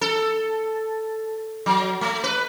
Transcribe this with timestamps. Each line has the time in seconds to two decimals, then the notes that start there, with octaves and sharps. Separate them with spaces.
0.01 A4
1.66 F#3
2.01 A3
2.24 B4